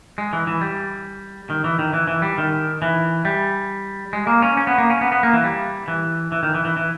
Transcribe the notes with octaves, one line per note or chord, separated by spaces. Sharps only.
G#3
E3
E3
G3
D#3
E3
D#3
E3
E3
G3
D#3
E3
G3
G#3
A#3
C#4
C#4
B3
A#3
C#4
B3
B3
A#3
E3
G3
E3
E3
D#3
E3
E3
E3